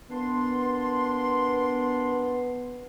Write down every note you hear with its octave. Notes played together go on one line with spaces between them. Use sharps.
A#2 B3 D4 C6